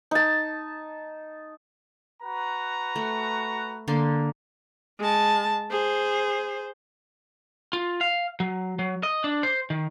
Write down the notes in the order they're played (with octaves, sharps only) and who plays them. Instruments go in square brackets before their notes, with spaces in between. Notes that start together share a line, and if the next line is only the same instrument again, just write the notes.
[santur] D#4 A5
[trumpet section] F#4 B4 A#5
[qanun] A3
D3 A#3 C6
[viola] G#3 A5
G#4 C5
[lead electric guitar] F4
F5
F#3
F#3
D#5
D4
C5
D#3